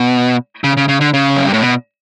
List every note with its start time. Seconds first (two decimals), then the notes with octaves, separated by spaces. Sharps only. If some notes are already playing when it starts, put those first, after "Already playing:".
Already playing: B2
0.64 C#3
0.77 C#3
0.88 C#3
1.01 D3
1.14 C#3
1.36 F#2
1.45 G2
1.53 A2
1.62 B2